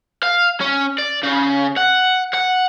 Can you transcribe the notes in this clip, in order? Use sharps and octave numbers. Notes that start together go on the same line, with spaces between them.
F5
C#4
D5
C#3
F#5
F#5